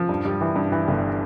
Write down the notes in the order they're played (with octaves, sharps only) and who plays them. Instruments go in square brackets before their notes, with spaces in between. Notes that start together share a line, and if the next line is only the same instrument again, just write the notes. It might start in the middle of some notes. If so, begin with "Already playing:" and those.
Already playing: [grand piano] F3
G2
G3
E3
G2
E3
G1